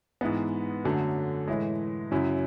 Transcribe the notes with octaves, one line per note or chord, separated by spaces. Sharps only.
G#2 E3 G#3 B3
F#2 D3 F#3 A3
A2 E3 G#3
F#2 C#3 F#3 C#4 E4